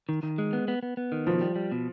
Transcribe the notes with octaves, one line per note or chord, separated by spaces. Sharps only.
D#3
D#3
G#3
B3
B3
B3
B3
D#3
B2 F3
G3
G3
B2